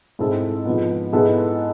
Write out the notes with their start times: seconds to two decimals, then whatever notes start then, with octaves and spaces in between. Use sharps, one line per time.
0.19 G#2 G#3 C4 E4 A4
0.66 G#2 F3 B3
1.13 G#2 G#3 B3 E4 A4